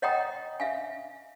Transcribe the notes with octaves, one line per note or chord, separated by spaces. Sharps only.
C#5 D#5 F#5 G5 A#5 D#6
E5 F5 G#5